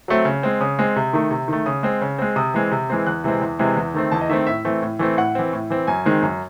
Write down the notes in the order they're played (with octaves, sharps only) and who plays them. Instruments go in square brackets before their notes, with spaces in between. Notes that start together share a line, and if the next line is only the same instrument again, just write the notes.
[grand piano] F#3 A3 C4
C#3
G#3 C4
C#3 D#6
G#3 C4
C3
D#3 A3
C3
D#3 A3
C#3 D#6
G#3 C4
C#3
G#3 C4
C3 D#6
E3 G#3 C4
C3
E3 G#3 C4
E2 F#6
C3 E3 G#3 C4
E2
C3 E3 G#3 C4
E2
D#3 A3 C4
E2 A5
D#5
D#3 A3 C4 E5
A2 E5
E3 A3 C4
A2
E3 A3 C4
A2 F#5
E3 C4
A2
E3 C4
F#2 G#5
D#3 G#3 C4
F#2